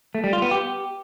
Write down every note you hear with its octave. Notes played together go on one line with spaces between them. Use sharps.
A3
G3
F4
B3
G4